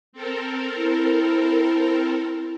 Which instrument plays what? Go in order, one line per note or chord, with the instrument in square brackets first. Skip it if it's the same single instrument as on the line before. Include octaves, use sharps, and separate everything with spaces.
[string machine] C4 A4 A#4
[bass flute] E4